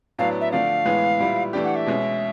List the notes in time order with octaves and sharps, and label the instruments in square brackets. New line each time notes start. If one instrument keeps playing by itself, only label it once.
[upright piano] A2 F#3 B3 D4 [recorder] F5
[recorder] E5
[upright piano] D3 F3 A3 D4 [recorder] F5
[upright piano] A2 E3 G#3 B3
A#2 G3 B3 E4
E3 A3 D4 G4
[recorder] F#5
E5
[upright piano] B2 G#3 C#4